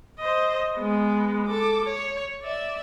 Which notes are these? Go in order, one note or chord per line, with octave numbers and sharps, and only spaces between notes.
C5 D#5
G#3 B3
A4 D6
C#5
D5 E5